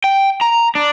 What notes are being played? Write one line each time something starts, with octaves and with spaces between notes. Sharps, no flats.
G5
A#5
D4